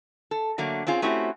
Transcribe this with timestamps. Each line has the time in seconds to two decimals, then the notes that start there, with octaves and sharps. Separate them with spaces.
0.31 A4
0.58 D3 F#3 A3 A#3
0.87 C4 C#4 F4 G#4
1.02 A3 C4 C#4 E4 F#4 G4